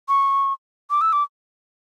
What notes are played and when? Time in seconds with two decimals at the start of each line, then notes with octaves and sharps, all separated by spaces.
0.09 C#6
0.90 D6
1.01 E6
1.13 D6